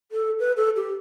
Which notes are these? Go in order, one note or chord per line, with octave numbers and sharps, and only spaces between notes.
A4
B4
A4
G4